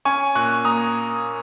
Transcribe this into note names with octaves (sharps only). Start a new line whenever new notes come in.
C#4 G#5 C#6
A#2 C#6 F#6
A#3 A#5 D#6